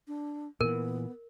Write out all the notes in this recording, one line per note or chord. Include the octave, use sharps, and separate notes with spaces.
D4
A#2 E3 B3 A#4